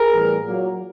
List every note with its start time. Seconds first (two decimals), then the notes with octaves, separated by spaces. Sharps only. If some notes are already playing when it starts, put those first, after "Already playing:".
Already playing: G#4 A#4
0.12 A2 E3 G3 B3
0.43 A#2 F#3 A#3